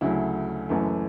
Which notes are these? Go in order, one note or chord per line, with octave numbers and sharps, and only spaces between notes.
D2 C#3 F#3 A3 E4
F#1 F#2 E3 A3